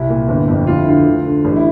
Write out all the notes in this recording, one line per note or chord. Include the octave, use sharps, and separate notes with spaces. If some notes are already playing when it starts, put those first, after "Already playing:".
Already playing: C2 E4
A#2
G1
F2
D2 F4
E4
D3 F4
D2
D3
A1
E4